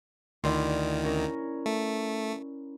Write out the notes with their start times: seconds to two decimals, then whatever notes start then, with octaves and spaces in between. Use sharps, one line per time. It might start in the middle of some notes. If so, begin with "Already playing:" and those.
0.44 D2 D#3 E4 D5 C6
1.04 C#4 A#4
1.66 A3